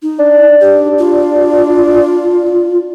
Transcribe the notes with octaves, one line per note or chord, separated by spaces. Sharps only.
D#4
D4
G4
F4